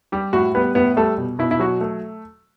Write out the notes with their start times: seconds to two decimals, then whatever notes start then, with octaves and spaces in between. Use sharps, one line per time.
0.12 G3 G4
0.33 A2 F#4
0.55 G3 B3 B4
0.75 A2 B3 B4
0.97 G3 A3 A4
1.18 B2
1.39 B2 E4
1.51 E4
1.59 F#3 F#4
1.81 A3